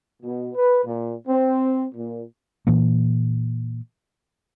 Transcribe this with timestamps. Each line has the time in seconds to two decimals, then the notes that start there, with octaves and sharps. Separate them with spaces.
0.22 B2
0.54 B4
0.85 A#2
1.27 C4
1.95 A#2
2.67 A#2 E3 A#3